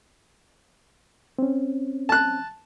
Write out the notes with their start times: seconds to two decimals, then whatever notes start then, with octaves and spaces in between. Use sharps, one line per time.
1.39 C4 C#4
2.09 A5 F#6